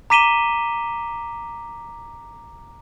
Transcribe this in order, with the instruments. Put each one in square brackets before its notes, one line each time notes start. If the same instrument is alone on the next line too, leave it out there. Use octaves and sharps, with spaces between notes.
[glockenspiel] A#5 D6 B6 D#7 E7 G7